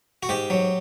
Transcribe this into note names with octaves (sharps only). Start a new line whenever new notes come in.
F#4
G#2 G4
F#3